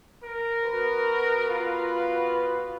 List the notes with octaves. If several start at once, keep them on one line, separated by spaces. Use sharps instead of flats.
A#4
B3 F#4 B4
F4